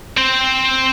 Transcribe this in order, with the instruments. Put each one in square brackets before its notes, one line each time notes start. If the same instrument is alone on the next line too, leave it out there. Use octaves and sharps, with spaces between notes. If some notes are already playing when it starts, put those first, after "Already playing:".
[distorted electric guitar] C4 C5